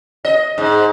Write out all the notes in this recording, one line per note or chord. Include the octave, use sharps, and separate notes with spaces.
D#5
G#2